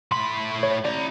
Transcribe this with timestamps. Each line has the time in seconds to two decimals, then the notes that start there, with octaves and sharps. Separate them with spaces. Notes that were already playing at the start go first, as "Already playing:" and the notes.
0.12 A2 B5 C6
0.63 C#5
0.85 E4 D5 A#5